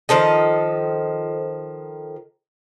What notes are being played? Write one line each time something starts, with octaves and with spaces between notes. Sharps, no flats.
D#3 F3 A4 D#5